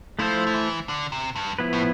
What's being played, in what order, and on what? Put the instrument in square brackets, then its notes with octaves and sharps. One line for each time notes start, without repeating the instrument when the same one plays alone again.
[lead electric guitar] F3 [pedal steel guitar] A3 E4 A4 C5
[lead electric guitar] F3
E3
D3
C3
G2
[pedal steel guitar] F3 B3 E4 B4
[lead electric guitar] A2